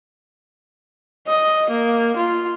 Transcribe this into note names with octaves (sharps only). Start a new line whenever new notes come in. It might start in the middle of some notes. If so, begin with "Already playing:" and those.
D#5
A#3
F4